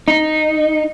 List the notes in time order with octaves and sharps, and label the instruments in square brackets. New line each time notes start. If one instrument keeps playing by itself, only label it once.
[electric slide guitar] D#4